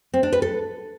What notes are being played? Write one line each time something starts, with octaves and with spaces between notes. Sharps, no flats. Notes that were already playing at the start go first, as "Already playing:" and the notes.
C4
D4
B4
A4